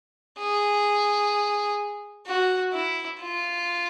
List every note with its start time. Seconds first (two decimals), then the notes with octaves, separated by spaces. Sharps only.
0.39 G#4
2.27 F#4
2.73 E4
3.21 F4